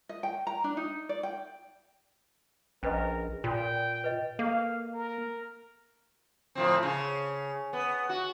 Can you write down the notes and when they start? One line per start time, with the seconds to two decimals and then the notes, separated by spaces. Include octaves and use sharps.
0.09 D#5
0.23 G5
0.47 A#5
0.64 D4
0.77 D#4
1.09 D5
1.23 G5
2.83 A#1 C#4 A#4 B4 D#5
3.44 A#2 F4 G5
4.04 B4 D#5
4.39 A#3 A4 F5
4.94 A#4
6.55 A2 F3 C4
6.83 C#3
7.73 B3
8.09 F#4